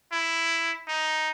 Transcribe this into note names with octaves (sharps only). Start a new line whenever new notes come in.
E4
D#4